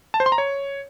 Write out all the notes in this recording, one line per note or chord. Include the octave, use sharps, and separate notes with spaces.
A5
C5
C6
A#5
C#5